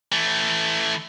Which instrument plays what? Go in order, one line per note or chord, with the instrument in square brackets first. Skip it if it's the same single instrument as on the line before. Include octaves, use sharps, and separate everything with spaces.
[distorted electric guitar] E3 A3